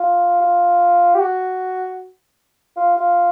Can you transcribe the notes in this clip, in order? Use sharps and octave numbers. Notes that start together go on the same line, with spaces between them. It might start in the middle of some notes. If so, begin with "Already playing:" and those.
Already playing: F4
F4
G4
F#4
F4
F4